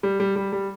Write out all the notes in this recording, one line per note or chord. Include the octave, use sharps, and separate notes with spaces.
G3
G3
G3
G3